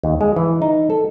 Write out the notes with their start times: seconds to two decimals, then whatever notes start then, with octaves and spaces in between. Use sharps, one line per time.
0.03 D#2
0.21 G#3
0.36 E3
0.62 D#4
0.90 A4